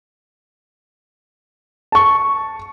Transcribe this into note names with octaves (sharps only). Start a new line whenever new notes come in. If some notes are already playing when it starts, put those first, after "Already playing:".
A5 C#6